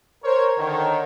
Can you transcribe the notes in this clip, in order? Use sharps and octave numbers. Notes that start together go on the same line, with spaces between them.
A#4 C5 C#5
D3 D#3 C#5